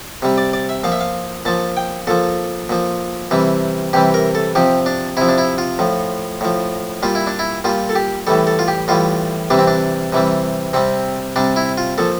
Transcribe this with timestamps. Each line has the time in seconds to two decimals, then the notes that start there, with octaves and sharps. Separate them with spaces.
0.22 C3 G3
0.38 D5
0.53 D5
0.69 E5
0.84 A#2 F3 F5
0.92 E5
1.01 F5
1.45 A#2 F3 A5
1.77 G5
2.07 A#2 F3 A4
2.69 A#2 F3
3.31 C3 E3 G3
3.93 C3 E3 G3 G4
4.14 A#4
4.35 A4
4.55 C3 F3 G4
4.86 D4
5.17 C3 F3 E4
5.29 D4
5.38 E4
5.58 F4
5.79 A2 F3
6.41 A2 F3
7.03 A#2 G3 F4
7.15 E4
7.27 D4
7.39 E4
7.64 A#2 G3 F4
7.89 A4
7.95 G4
8.27 A2 E3 G3 A4
8.47 A4
8.59 F4
8.68 G4
8.88 A2 E3 G3 F4
9.50 C3 E3 G3 D4
9.59 C4
9.67 D4
10.13 C3 E3 G3
10.73 C3 G3 C4
11.36 C3 G3 D4
11.56 E4
11.78 F4
11.98 A#2 F3 A4